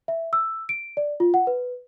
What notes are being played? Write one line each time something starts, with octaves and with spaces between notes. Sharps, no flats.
E5
E6
D7
D5
F4
F#5
B4